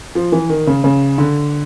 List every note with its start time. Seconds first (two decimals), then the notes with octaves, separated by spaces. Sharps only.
0.15 F3
0.32 E3
0.49 D#3
0.67 C#3
0.84 C#3
1.18 D3